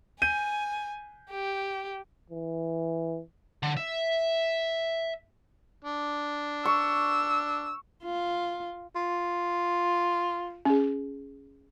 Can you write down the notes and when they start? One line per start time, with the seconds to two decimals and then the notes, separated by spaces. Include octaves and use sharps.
0.22 G#5 G6 D#7
1.30 G4
2.30 E3
3.63 D3
3.77 E5
5.84 D4
6.65 C#6 E6
8.04 F4
8.96 F4
10.65 C#4 G#4